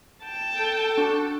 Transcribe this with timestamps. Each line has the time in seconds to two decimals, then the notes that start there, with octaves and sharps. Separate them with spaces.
0.24 G5 A5
0.57 A4
0.97 D4 F#4